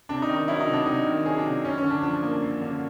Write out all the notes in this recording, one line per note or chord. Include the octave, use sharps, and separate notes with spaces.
C3 D4
D#4
D#3
D#4
F#3 E4
D#4
C3
D4
C3 D#4
D#3
F#3 G#4
D4
C3
F#2 C#4
C#4
D3
D4
F3 D4
A#3
F#2
D3